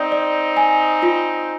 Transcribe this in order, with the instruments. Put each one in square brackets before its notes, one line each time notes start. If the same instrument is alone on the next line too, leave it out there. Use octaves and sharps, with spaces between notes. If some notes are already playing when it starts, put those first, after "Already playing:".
Already playing: [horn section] C4 D#4 [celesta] D5
[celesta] D5
G#5
F4